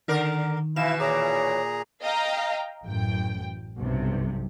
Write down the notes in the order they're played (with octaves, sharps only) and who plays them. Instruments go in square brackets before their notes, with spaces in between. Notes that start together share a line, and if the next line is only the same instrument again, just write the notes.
[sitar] D3 A#4 D5 [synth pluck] D#3
[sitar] B2 E3 [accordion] E4 [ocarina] F5 [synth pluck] E7
[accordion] A#2 G#4 A#5 [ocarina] C#5 [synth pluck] D6
[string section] D#5 F5 G5 A#5
A1 F#2 G5
B1 G2 C3